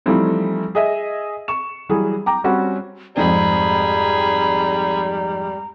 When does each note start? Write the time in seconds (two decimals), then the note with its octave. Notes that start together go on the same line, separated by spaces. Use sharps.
0.06 E3 F3 G3 A3 C4 D#4
0.75 G#4 D#5 E5
1.48 C#6 E7
1.89 E3 F#3 G3 G#4
2.26 G5 A#5 D6
2.44 G3 C4 C#4 F#4
3.16 F2 G#2 G3 C4 G#4 A#5 B5